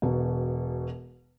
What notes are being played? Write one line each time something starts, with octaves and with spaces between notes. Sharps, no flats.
E1 B2